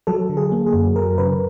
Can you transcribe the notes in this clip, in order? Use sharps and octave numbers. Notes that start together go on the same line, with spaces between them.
F#3 A4
D3
G#4
A#3
G#4
F#2
F#3 A#4
C#3 B4